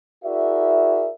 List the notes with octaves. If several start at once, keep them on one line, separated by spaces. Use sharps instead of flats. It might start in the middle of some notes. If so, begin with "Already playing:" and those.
E4 F#4 G#4 A#4 D5 E5